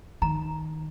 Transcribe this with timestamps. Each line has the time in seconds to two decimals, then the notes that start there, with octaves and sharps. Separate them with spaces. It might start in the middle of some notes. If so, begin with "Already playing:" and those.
0.22 D#3 A#5